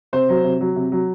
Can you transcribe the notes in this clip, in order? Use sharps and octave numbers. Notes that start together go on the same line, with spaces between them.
C3 C5
F#3
C3
F#3
C3
F#3